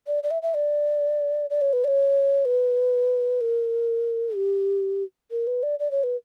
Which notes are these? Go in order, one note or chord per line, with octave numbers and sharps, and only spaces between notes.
D5
D5
E5
E5
D5
D5
C#5
B4
D5
C#5
B4
A#4
G4
A#4
B4
D5
D5
C#5
B4